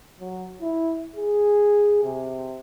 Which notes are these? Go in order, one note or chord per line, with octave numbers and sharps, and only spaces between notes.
F#3
E4
G#4
C3